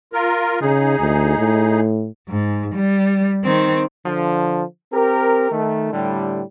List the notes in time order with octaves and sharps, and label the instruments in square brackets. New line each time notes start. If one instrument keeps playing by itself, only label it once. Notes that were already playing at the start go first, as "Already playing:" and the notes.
[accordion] F4 A#4
[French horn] C#3 [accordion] D#4 G#4
[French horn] D2
A2
[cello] G#2
G3
D#3 C4
[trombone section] D3 F3
C4 G4 A#4
D#3 A3
A2 D3 G3